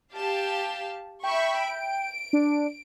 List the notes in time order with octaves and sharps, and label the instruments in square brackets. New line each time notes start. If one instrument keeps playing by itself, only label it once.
[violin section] G4 F5 A5
[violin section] E5 B5 C#6 [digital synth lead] G5
[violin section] D7
[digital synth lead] D4